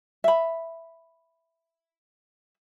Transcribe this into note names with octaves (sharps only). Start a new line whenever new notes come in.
E5 B5